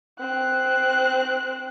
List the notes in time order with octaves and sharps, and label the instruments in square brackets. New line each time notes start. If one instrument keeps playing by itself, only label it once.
[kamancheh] C4 F#6